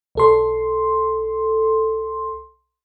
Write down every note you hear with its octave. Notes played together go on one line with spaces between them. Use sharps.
B1 A4 C6